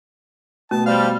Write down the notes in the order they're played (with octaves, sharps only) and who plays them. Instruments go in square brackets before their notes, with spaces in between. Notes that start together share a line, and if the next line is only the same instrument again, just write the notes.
[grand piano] B2 [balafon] A3 [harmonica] A5
[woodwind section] G3 [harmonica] C5 F5